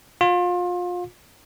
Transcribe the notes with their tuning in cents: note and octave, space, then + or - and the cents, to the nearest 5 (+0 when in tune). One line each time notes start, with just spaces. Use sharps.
F4 +30